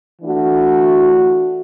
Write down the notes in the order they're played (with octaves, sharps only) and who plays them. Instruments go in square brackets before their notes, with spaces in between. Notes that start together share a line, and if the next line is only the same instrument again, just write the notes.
[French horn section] E3 A3 D4 F#4